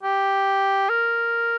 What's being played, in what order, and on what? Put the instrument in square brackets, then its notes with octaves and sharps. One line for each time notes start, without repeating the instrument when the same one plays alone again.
[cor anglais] G4
A#4